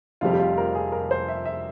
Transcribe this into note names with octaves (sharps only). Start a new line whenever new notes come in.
F1 F2 C3 G3 F4
G4
F4
A#4
G#4
A#4
C5
E5
E5